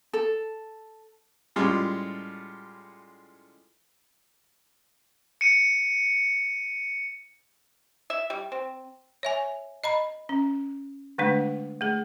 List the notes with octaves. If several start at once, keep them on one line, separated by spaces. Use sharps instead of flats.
A4
A2 G3 G#3 C#4 F4
C#7 D#7
E5
G3
C4
C#5 E5 G#5
D#5 A#5 B5
C#4
D3 G#3 A3 D4
A3 G#4